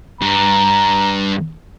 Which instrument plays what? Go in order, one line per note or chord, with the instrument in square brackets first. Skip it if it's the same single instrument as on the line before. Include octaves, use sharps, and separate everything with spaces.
[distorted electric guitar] G2 [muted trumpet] A#5